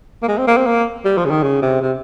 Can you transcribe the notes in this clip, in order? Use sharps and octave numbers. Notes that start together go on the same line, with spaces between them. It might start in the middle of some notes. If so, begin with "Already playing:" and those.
A#3
G#3
C4
A#3
C4
A#3
G3
F3
C#3
D#3
C#3
C3
C3